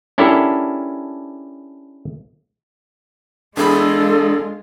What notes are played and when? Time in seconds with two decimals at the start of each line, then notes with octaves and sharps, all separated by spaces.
0.18 C#4 D4 E4 G4 A4 A#4
3.57 E2 G#3 D4 F4 G#4 A4 B5